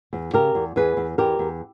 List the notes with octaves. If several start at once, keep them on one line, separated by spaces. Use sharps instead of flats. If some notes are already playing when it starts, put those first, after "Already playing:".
E2
C#3 G4 A#4
E2
E2 G#4 B4
E2
E2 G4 A#4
E2